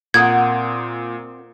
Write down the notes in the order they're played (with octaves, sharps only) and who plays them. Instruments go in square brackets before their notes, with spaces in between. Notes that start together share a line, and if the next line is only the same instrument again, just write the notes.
[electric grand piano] A#2 D#6 [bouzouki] C4 A#4 F#5 [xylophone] G#6